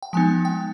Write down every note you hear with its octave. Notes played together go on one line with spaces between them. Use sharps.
G5
F3 G#3 B3 D#4 G#5
G5